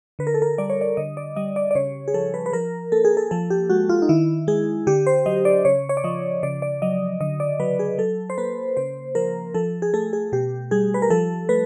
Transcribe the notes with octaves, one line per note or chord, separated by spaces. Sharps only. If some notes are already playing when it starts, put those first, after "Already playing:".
D3 B4
A#4
A4
A#4
G3 D5
C#5
D5
D3 D#5
D5
G3 D#5
D5
D5
C#3 C#5
G#4
F3 A4
B4
B4
F3 A#4
A#3 A4
G#4
A4
F3 A4
G4
G#3 F#4
F4
D#4
D#3 E4
G#3 G#4
D3 G4
C5
F#3 D#5
D5
C#3 C#5
C#5
D5
F3 D#5
C#3 D5
D5
F#3 D#5
D3 D#5
D5
F#3 B4
G#4
F#3 A4
C5
A#3 B4
C#3 C5
F3 A#4
F3 A4
G#4
A3 A4
G#4
B2 G4
G3 G#4
B4
A#4
F3 A4
A3 B4